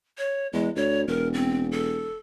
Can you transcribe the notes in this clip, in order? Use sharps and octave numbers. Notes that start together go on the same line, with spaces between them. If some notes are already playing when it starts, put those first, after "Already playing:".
C#5
E2 G#3
D2 C#5
E1 A#4
C4
A4